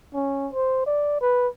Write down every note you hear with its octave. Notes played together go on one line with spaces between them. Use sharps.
C#4
C5
D5
B4